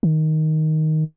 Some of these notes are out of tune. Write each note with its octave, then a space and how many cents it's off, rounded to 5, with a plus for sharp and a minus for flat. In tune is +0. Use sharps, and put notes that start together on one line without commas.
D#3 +5